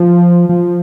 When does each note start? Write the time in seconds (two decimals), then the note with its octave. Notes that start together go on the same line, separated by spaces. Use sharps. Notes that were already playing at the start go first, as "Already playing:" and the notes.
Already playing: F3
0.49 F3